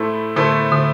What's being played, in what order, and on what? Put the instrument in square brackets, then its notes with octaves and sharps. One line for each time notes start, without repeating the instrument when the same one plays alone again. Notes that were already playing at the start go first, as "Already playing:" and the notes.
Already playing: [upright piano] A2 A3 E4 A4 C5
[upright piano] A2 A3 E4 A4 C5 [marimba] D3
[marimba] D3